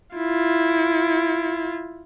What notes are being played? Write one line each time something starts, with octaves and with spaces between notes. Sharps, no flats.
E4 F4